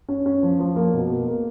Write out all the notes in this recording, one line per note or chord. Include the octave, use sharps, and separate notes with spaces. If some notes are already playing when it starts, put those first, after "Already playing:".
C#4
C#4
F3
F3
A#3
B2
A#3
A#3